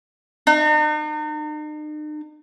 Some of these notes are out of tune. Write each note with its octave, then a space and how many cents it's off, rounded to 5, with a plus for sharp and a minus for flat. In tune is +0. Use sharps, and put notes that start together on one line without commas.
D#4 -45